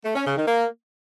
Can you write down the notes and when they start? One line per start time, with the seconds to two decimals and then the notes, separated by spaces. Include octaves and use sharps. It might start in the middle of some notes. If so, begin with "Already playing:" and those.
0.05 A3
0.16 C#4
0.26 C#3
0.37 D#3
0.47 A#3